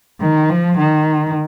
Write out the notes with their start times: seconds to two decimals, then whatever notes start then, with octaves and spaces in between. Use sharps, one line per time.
0.21 D#3
0.50 F3
0.79 D#3